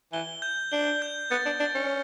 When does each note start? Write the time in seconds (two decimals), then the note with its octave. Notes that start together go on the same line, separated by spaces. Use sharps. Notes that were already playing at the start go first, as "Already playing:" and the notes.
0.13 E3 G7
0.42 G6
0.72 D4 G7
1.02 G6
1.31 B3 A6
1.45 D4
1.60 D4 A6
1.75 C#4